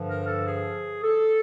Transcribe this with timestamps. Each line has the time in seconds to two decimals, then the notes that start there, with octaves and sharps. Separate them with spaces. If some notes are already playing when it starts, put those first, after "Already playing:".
Already playing: G2 D3 F3
0.10 A#4
0.28 A4
0.47 G#4
1.03 A4